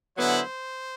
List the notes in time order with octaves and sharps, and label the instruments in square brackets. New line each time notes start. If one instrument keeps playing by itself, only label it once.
[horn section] D3 F#3 B3 E4 [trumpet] C5